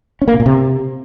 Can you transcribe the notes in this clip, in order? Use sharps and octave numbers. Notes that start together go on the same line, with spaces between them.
C#4
A#3
B2
A#2
C3